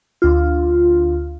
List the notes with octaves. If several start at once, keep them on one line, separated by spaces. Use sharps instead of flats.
D2 F4